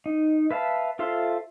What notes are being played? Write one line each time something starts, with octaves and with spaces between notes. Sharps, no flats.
D#4
B4 E5 F5 A5
F4 A4 C5 E5 C6